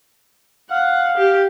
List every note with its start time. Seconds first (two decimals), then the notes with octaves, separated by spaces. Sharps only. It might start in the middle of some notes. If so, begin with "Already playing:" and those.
0.71 F5 F#5
1.17 G4